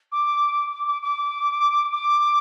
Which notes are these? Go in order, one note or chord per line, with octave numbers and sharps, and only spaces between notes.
D6
D6
D6
D6
D6